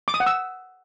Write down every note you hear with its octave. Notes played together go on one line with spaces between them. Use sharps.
D6
D#6
F#5
E6